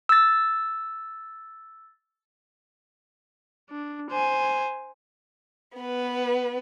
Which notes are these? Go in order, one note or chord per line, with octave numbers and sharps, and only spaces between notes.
E6 A6
D4
C5 G#5
B3 B4